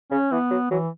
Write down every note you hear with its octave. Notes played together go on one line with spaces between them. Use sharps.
C#3 C#4
E3 B3
F#3
E3 F#3